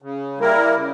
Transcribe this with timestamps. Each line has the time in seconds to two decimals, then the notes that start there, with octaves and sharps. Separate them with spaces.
0.02 C#3
0.38 G3 A#3 E4 A#4
0.75 C#3